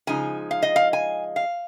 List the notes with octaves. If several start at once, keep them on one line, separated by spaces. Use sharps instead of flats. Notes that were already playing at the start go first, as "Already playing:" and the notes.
C#3 F3 G#3 D#4 G#5
F5
D#5
F5
G#5
F5